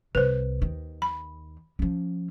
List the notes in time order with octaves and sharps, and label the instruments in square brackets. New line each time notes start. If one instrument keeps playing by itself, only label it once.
[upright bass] C2 [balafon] B4 C5
[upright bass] D#2 D#3
[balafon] B5
[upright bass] F3 C#4